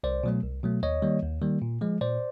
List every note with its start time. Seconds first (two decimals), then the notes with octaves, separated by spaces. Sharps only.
0.04 C2 C5 D5
0.23 B2 F#3 A3
0.43 C2
0.63 B2 F#3 A3
0.83 D#2 C#5 D#5
1.02 D#3 G3 A#3
1.22 D#2
1.41 D#3 G3 A#3
1.62 A#2
1.81 F3 G#3
2.01 A#2 C5 D5